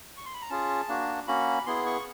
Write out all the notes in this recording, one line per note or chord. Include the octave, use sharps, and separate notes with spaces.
C#6
C6
B5
A#5
C#4 F4 G#4 A5
A#3 D4 F#4
A#3 C#4 F#4 B5
B3 E4 G#4 C6
C#6